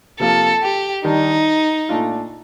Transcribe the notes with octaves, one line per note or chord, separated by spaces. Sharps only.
C3 F3 A#3 F4 A4
G4
D#3 G3 D4 D#4
A#2 A3 D4 F4